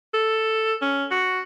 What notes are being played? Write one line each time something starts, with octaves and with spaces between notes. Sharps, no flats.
A4
C#4
F#4